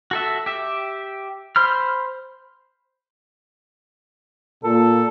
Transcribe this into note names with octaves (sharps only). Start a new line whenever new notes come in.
F#4 A4 E5
G4 E5
C5 B5 F6
A#2 A4